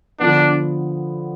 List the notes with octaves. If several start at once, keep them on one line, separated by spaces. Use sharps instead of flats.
D3 F3 B3 D4